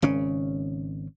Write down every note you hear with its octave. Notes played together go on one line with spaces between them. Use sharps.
G#1 C#3 C#4